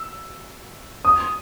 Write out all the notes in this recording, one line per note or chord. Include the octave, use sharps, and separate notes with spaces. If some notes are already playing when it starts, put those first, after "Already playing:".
Already playing: E6
D#6